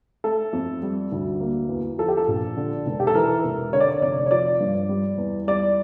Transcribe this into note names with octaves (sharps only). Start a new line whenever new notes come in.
A3 A4
F2
G3
D2
A#3
E2
F3 A4
G4
A4
A#1
D3
E1
G4
A4
E3 A#4
E1
D3 C#5
D5
C#5
F1 D5
C#5
F3 D5
G2
G3
E2
G3 D5